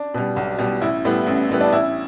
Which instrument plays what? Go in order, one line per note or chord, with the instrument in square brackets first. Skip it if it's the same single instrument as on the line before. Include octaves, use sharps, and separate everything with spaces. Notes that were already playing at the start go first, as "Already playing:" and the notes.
Already playing: [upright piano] D4
B2 G3
B1
B2 G3
A1 E4
A2 G3 B3
A1
A2 G3 B3
D4
A1 E4